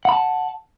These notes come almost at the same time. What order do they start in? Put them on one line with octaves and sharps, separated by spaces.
F#5 B5 A5